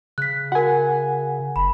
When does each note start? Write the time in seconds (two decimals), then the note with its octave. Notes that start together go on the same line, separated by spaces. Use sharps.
0.18 C#3 F#6 B6
0.52 F#4 A#4 F#5 G#5
1.56 F#1 B5